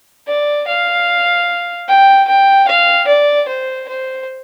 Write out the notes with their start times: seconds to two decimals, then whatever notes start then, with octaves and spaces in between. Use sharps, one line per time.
0.28 D5
0.68 F5
1.88 G5
2.28 G5
2.68 F5
3.07 D5
3.48 C5
3.88 C5